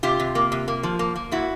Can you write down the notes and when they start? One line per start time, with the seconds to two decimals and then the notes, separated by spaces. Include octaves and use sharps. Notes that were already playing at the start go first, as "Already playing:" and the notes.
0.03 C3 F4 G4
0.20 C3
0.35 A#3
0.52 C3
0.68 A#3
0.83 F3
0.99 A#3
1.16 A#3
1.32 A#2 E4 F#4